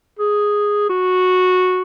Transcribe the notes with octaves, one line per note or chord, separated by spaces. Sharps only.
G#4
F#4